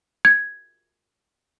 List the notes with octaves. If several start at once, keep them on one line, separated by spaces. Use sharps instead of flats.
G#6